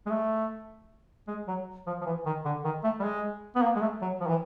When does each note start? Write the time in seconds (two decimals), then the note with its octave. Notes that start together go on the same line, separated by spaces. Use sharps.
0.06 G#3
0.11 A3
1.28 G#3
1.48 F#3
1.87 F3
2.01 F3
2.06 E3
2.26 D#3
2.45 D3
2.64 D#3
2.84 A3
3.00 G3
3.03 G#3
3.56 B3
3.62 A#3
3.76 G#3
3.81 A3
4.01 F#3
4.21 F3
4.28 E3